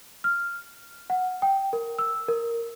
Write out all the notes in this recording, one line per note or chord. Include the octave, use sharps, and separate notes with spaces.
F6
F#5
G5
A#4
E6
A#4